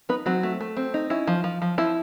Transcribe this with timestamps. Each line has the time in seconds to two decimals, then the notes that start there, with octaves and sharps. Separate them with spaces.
0.09 B3 D#4 B4
0.26 F#3 C4 F#4
0.43 A3
0.61 A3
0.77 C4
0.94 D#4
1.10 C#4 E4
1.27 F3
1.44 F3
1.62 F3
1.78 F3 E4